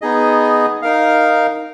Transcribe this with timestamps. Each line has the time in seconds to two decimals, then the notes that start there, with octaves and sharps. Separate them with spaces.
0.02 B3 D#4 G#4 D#5
0.82 D#4 A#4 F5